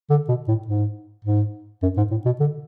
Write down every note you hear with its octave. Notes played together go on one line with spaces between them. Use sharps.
D3
B2
A2
G#2
G#2
F#2
G#2
A2
B2
D3